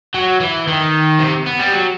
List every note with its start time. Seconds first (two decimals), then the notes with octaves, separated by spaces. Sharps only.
0.14 F#3
0.40 E3
0.67 D#3
1.19 C3
1.46 B3
1.59 G3
1.72 F#3